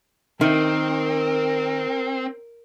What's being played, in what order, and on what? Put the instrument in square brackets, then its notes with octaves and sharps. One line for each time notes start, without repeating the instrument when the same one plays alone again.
[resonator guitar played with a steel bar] D#3 [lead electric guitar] C4 [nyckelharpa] A#4